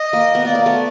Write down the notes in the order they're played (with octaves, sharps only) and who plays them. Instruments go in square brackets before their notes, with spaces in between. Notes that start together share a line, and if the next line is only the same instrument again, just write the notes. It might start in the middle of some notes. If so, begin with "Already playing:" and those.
Already playing: [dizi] D#5
[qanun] A#3
B3
[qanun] A#3 [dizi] D5
[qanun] A#3
A3 B3